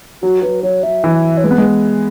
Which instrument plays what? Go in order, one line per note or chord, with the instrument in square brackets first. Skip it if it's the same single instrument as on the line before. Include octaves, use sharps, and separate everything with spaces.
[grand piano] F#3 [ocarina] F#4
[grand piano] F#3 [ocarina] B4
[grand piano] F#3 [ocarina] C#5
[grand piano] F#3 [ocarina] E5
[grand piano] E3
[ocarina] E5
C#5
[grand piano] G#3 [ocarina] B4
[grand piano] B3
G#3